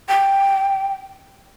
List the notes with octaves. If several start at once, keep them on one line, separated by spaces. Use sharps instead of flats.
G5